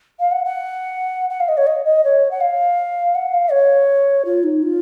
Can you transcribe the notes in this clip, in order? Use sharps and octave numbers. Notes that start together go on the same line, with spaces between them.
F5
F#5
F#5
F#5
F5
D#5
C#5
D#5
D#5
C#5
F#5
F5
F#5
F5
C#5
F4
D#4
F4